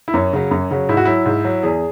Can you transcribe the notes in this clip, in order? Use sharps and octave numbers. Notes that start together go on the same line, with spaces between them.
E4
F#2 C#4
C#3 F#3
F#2
C#3 F#3
G#2 E4
F#4
F#3 E4
G#2
F#3
E2 G#4